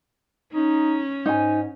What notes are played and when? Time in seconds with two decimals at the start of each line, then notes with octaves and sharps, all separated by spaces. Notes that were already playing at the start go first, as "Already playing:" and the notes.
0.54 C#4 D#4
1.26 G#2 D#4 G#5